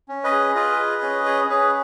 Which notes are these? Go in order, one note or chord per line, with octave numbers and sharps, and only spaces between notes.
C#4
B4 D#5
G#4
F4 B4 D#5
G#4
C#4
G#4
C#4 G#4 B4